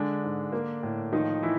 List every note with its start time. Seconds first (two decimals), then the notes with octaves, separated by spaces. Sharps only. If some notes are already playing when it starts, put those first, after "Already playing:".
Already playing: D3 G#3 D4
0.23 G#2
0.52 A#3
0.83 A2
1.12 D#3 F3 D#4
1.43 E3 E4